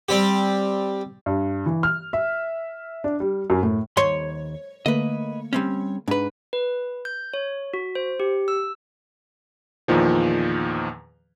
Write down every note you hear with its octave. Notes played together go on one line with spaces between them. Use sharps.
G3 C4 G4
G2
E3
F6
E5
D4
G3
F#2
A2
D#2 C#5 C6
D3 A3 A#3 B4 D#5
G3 C4 C#4
G#2 D4 B4
B4
G6
C#5
F#4
C5
G4
E6
E2 A#2 D#3 F3